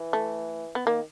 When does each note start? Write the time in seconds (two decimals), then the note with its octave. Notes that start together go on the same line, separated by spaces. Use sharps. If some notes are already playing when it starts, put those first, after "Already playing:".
Already playing: E3
0.13 A3
0.75 B3
0.86 D#3 A#3